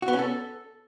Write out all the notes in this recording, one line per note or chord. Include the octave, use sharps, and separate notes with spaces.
F#4
B3
C#4
A4